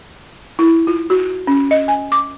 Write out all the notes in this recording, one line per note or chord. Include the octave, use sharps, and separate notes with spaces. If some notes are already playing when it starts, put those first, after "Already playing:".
E4
F4
F#4
C#4
D#5
G#5
D6